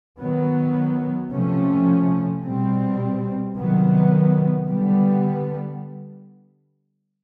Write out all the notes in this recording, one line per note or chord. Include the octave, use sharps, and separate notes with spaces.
D#3 F#3 B3
C3 F3 A3 C#4
B2 G3 C4
C3 D#3 F#3 B3
D3 G3 B3